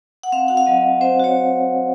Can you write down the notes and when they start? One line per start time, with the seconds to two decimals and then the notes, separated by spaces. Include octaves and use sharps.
0.23 F#5
0.32 C4 F5
0.48 F#4 F#5
0.57 F5
0.66 F#3 D#5
0.85 F#3
1.01 C4 C5
1.19 F#4 C#5